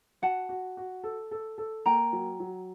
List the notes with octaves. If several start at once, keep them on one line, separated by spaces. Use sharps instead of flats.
F#4 F#5 A5
F#4
F#4
A4
A4
A4
A#3 G5 A#5
F#3
F#3